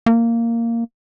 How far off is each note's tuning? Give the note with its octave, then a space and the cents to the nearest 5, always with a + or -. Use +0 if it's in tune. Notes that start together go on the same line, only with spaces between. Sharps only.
A#3 -10